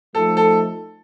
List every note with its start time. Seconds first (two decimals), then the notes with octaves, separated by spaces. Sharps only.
0.15 F3 A3 D#4 A4
0.37 A4